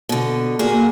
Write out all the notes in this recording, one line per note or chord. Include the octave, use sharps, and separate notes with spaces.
B2 D3
A#2 A#3 F#4 G#4